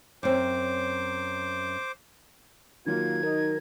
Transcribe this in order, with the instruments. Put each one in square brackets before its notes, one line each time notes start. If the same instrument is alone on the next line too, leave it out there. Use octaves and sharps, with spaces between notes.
[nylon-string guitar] F#2 C4 [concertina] C5 D6
[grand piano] D#3 F#3 [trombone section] A#3 F4 [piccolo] G#6
[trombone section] D#4 [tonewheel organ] A#4